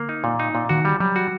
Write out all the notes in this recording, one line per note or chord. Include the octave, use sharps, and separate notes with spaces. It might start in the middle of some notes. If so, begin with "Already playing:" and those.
Already playing: D3 A#3
D#4
A#2
D#4
A#2
D#3 F#4
G3
F#3 G3
F#4